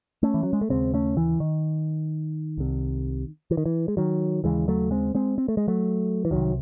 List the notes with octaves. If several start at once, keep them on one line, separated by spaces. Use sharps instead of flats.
A3 C#4
E3
F#3
G#3
A3
D#2 C#3 G#3 C4
A3 C#4
E3
D#3
C2 C3
E3
D#3
E3
G#3
D#3 F#3
D#2 C#3 E3 G#3
F#3 A3
G#3 C4
G#3 C4
C4
A3
G#3
F#3 A3
E3
C2 C3 D#3 F#3